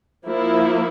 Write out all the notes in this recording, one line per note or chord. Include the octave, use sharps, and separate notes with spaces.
F3 A#3 E4